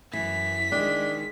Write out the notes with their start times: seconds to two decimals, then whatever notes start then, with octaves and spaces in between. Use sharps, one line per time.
0.13 F#2 E3 B6
0.72 D#3 G#3 D4